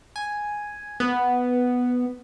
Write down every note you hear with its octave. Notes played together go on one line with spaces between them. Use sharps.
G#5
B3